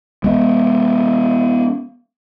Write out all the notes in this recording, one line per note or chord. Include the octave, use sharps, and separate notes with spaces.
G#3 B3